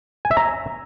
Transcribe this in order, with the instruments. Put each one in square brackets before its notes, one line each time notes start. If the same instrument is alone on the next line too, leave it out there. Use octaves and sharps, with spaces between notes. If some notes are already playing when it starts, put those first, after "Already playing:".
[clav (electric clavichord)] G#5
E5
A#5